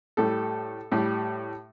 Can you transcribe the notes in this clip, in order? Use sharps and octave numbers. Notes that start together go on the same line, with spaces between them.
A2 G3 A4
A2 G3